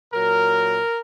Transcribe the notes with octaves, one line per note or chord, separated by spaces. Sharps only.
A#2 F#3 A#4